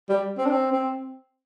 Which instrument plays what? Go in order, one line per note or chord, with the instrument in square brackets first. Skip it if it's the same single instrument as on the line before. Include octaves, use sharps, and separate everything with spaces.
[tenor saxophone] G3
C4
D4
C4
C4